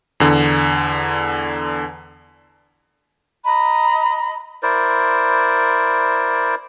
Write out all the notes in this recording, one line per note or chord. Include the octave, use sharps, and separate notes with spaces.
E2 D3
D#5 A#5 B5
E4 A#4 C5 D5